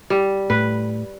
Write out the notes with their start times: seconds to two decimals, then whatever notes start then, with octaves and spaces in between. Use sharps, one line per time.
0.10 G3
0.50 A2 B4